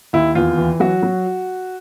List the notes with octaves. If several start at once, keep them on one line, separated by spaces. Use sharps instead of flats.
D#2 E4
E2 F4
E3
F#3 F#4
F#3